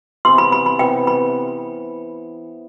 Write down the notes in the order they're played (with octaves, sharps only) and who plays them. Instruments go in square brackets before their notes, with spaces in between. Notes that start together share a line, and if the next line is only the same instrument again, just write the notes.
[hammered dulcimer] C3 E3 B3 [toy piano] C6
[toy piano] B5
B5
B5
[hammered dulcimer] C3 E3 B3 [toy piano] G5
[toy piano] B5